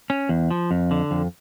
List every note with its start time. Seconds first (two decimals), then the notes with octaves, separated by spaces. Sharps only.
0.10 C#4
0.29 E2
0.51 F3
0.71 F2
0.91 D3
1.11 F2